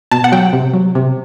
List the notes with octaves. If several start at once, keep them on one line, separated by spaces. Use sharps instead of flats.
B2 A5
F#5
F#3 G5
C3
F#3
C3